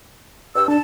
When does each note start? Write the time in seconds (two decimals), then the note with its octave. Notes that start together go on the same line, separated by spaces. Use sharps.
0.55 G2 E6
0.68 D4 A5